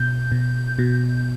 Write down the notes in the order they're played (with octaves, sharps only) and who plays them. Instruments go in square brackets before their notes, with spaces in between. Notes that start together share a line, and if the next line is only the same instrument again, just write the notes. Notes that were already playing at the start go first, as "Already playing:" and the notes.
Already playing: [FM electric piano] B2 G6
B2
B2